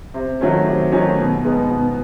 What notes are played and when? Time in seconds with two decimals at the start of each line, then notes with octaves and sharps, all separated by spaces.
0.14 C3
0.41 D#3 F#3 A3 C#4
0.67 C3
0.92 D#3 F#3 A3 C#4
1.18 B2
1.44 G#3 B3 D#4
1.71 B2